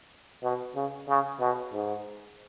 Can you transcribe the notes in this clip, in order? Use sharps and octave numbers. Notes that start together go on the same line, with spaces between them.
B2
C#3
C#3
B2
G#2